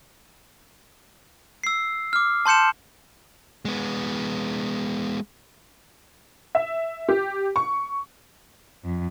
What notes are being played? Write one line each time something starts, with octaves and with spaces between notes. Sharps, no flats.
E6 C7
D6 F6
A5 C6 G6 C#7 E7
G#3 B3
E5
G4
C#6
F2